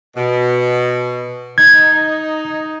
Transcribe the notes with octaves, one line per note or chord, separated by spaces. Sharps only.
B2
D#4 G#6